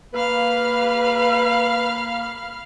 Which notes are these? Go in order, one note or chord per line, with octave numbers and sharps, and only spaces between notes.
A#3 B4 F5 B5 F6